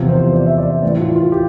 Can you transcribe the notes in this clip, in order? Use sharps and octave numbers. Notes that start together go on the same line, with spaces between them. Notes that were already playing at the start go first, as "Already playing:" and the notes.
Already playing: E2 C3 F3 F4
C5
D5
E5
D5
A2 E3 D5
F4
F4
G4